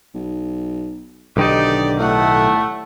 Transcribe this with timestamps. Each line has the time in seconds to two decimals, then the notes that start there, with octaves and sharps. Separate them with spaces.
0.14 B1
1.37 B1 D3 D#3 D#4 G4 D5
2.00 A2 A3 F#5